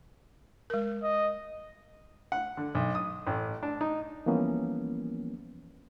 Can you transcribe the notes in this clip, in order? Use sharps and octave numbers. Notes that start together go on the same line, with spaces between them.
G#3 A#4
D#5
F#5
D3
B1
D#6
A1
D4
D#4
E3 F3 G3 A#3 B3 C#4